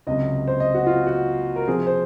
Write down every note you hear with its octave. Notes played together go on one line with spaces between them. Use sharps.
C#2 C3 F#3 D#5
C5
D#5
F#4
F4
F#4
A#4
C3 F3 C4 G#4
C5